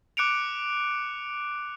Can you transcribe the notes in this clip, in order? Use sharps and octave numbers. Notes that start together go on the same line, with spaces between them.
D6 F#6 C#7 D7 F7